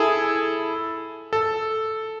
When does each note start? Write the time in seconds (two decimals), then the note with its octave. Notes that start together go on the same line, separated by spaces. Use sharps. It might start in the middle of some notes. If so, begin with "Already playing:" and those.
Already playing: E4 G#4 A4
1.33 A4